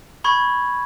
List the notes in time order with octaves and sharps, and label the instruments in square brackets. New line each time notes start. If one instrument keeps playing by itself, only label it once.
[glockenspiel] B5 C#6 G#6